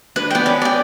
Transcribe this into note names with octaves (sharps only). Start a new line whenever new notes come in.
D4 B4
B3 D5 G5
C#4 B4
D5 G5